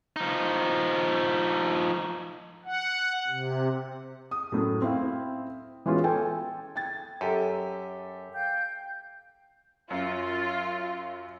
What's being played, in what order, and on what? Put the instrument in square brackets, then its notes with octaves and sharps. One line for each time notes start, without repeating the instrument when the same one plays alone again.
[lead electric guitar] F3 D#4
[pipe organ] F#5
C3
[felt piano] D#6
F#2 A2
C4 E4 F5
E3 G#3 B3 C#4 F4 F#4
A4 G5 G#5
G5 G#6 A6
[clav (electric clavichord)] F#2 [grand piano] G4 A4
[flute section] F5 G5 G6
[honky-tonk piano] F#2 [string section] F4